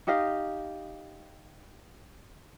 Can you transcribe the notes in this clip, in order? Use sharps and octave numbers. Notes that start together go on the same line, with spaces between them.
D#4 G4 D#5 F5